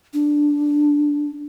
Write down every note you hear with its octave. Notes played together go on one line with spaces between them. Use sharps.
D4